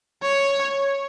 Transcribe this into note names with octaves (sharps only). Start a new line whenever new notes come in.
C#5